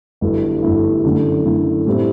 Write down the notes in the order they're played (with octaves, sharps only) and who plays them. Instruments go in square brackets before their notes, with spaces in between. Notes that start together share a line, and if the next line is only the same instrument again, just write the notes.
[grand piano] G1 G2 F#3 A3 E4
G1 G2 F#3 A3 E4
F#2 D3 A3 E4
F#2 D3 A3 E4
A2 G3 C4 E4